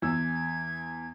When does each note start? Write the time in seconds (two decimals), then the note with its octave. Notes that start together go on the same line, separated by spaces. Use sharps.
0.02 E2 E6 G#6